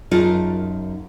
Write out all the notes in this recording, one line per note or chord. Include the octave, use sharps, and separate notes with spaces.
F#2 D#4 F4 G#4 A#4 A5